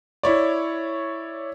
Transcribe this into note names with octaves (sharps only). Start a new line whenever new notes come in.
E4 C#5 D5